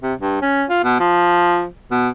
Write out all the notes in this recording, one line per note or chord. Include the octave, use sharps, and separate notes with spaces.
C3
G2
C#4
F4
B2
F3
B2